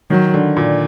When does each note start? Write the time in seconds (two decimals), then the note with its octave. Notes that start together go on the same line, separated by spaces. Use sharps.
0.10 D#3 F#3
0.34 D3
0.57 A#2